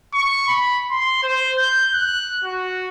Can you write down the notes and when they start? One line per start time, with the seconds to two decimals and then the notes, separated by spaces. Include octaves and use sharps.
0.14 C#6
0.48 B5
0.91 C6
1.23 C5
1.58 G6
1.94 F#6
2.45 F#4